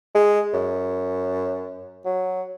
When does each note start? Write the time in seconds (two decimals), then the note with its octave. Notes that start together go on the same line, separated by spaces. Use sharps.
0.15 G#3
0.53 F#2
2.06 F#3